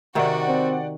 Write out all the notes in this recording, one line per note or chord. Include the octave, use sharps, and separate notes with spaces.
C3 D#3 F#4 D5 F#5 G5
C4